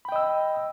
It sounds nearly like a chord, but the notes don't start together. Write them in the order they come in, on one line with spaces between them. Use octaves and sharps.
B5 G5 D#5 E6